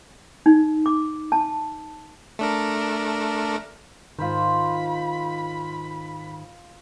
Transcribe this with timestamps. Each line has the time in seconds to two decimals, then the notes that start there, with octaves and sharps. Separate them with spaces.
0.46 D#4
0.86 D6
1.32 A5
2.39 A3 D4 A#4
4.19 G#2 D#3 F4 C5 B5